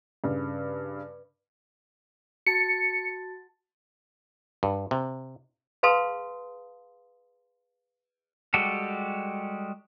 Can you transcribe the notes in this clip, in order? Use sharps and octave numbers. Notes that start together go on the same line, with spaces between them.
G2 C#3
F#4 A5 A6 C#7
G2
C3
G#4 B4 F5 A5 C6 D#6
G3 G#3 F#4 G4 A4